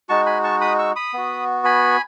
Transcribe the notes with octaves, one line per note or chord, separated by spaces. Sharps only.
G#3 D#4 F#4 A5 C#6
G#5 B5
A5 C#6
B5 D#6
C#6 E6
B5 D#6
B3 F#4
G#5 B5